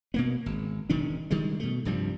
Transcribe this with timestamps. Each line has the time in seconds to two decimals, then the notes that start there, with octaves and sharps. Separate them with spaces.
0.14 B2 A#3 B3
0.46 G#1
0.90 E1 D#3 C#4 D4
1.31 D#3 G3 G#3
1.60 B2 A3
1.85 C2 G2 F3 G3